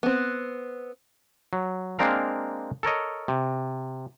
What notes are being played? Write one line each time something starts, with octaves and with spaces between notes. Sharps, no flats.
B3 C4
F#3
G#3 A#3 C4 D4 A#4 F5
A4 A#4 C#5 D#5
C3